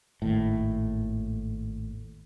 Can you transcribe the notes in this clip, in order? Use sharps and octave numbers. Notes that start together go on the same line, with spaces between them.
G#1 D#2 A2